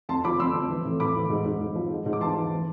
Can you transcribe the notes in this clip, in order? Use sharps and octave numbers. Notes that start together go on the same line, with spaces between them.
F2 A5 C6
F3 B5 D6
F2 C6 E6
F2
E3
A2
A2 B5 D6
E3
G#2
G#2
G#2
F3
G#2
G#2
D6
E3 A5 C6
E3
E3